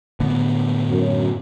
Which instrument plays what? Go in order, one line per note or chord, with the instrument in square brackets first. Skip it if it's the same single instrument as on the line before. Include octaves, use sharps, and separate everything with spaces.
[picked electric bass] A2 D3 B3
[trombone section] F#2